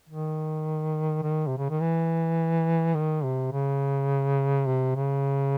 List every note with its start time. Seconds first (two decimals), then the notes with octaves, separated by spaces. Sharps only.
0.09 D#3
1.23 D#3
1.47 C3
1.58 C#3
1.70 D#3
1.80 E3
2.95 D#3
3.24 C3
3.52 C#3
4.66 C3
4.96 C#3